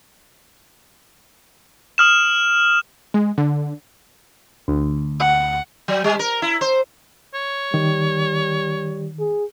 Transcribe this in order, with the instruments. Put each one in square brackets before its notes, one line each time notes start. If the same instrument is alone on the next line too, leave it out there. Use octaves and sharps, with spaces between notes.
[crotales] D#6 F6 E7
[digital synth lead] G#3
D3
[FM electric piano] D2
[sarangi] F#5
[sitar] F#3
G3
A#4
E4
C5
[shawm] C#5
[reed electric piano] D#3 [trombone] G3
[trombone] G#4